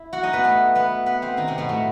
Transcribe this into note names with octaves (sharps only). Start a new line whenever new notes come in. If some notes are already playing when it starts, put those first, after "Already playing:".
Already playing: E4
F#4 F#5
D#4 D#5
B3 B4
A3 A4
B3 B4
B3 B4
C4 C5
D#3 D#4
C3 C4
B2 B3
A2 A3